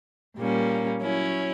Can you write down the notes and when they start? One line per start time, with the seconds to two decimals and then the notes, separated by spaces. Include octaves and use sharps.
0.37 A#2 G3 A#3 C#4
1.01 F#3 C#4 E4